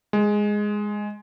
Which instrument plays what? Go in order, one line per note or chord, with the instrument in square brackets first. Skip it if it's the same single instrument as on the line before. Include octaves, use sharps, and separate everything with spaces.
[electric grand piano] G#3